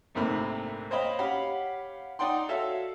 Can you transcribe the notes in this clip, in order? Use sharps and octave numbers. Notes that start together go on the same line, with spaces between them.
A#1 G#2 C3 A3 A#3 B5
C5 C#5 D#5 F5 G5 B5
C#4 G4 F5 F#5 B5
D#4 D5 F#5 G5 C6
F#4 A4 C#5 E5 F5